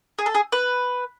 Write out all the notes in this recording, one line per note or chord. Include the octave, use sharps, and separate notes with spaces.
G#4
A4
G#4
B4